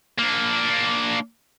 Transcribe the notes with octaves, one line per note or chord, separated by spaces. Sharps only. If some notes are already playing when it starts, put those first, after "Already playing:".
A#3 D4